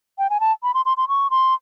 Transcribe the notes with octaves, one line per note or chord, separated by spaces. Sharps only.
G5
G#5
A5
B5
C6
C6
C6
C#6
C6